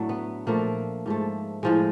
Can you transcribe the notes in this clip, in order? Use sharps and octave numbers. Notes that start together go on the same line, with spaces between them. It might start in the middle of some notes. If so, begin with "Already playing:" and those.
Already playing: A2 F#3 A3 D4
B3
A#2 F3 A3 A#3
G#2 F3 A3
A2 F3 G#3